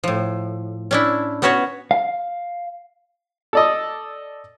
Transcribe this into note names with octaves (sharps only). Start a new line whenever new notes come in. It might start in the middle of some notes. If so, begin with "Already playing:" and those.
A2 F3
C#4 D4 E4
B3 C#4 F#4 B4 C#5
F5
A4 D5 D#5